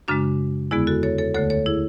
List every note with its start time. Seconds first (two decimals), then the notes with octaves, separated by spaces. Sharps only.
0.08 F#2 C#3 G#3 D4 F#4
0.71 E2 D3 G#3 B3 E4 G#4
0.87 F#4 A4
1.03 A4 C#5
1.18 A4 C#5
1.34 D2 D3 A3 A4 C#5
1.50 A4 C#5
1.66 E4 G#4